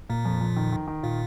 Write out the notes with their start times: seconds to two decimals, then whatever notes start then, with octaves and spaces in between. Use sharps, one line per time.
0.09 A#2 A#3
0.25 F2
0.41 F2
0.56 D#3
0.72 D#3
0.88 D#3
1.03 A#2 F4